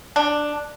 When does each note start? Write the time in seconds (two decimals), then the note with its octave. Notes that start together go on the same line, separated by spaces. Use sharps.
0.16 D4